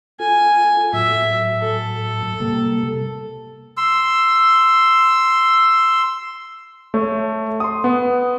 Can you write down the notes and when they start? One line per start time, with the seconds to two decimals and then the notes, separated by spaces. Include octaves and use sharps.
0.20 F4 A4 G#5
0.93 A2 F#3 E5
1.61 A4
2.40 C3 G3 A#3
3.77 C6 E6
6.94 A3 C#5
7.60 C6 D#6
7.84 B3